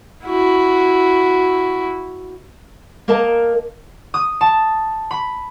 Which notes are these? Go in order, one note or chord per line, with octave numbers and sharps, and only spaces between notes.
E4 F#4
A#3 A#4 D#5 A5
D#6
A5
B5